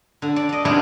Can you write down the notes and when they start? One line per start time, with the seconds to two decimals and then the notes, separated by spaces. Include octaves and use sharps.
0.22 D3
0.36 D5
0.49 D5 D#5
0.65 C3 D#3 G#3 B3 D4 E4